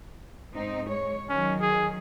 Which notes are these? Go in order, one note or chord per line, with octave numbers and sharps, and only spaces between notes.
G#2 C4 D#4
G#3 C#5
D#3 F#3 C#4
G#4